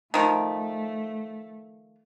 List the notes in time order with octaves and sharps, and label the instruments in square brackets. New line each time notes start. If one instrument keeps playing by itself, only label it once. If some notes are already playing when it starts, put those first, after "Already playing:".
[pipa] D#3 F3 [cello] A3